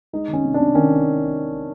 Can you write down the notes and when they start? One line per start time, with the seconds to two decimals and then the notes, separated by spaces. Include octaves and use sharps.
0.13 G#3 D#4
0.28 D#3
0.33 C#4
0.44 C3
0.54 C3 D4
0.75 D#3 C#4